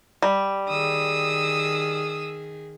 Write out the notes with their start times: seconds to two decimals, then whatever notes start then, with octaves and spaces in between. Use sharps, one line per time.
0.22 G3
0.69 D#3 G#4 D#6 E6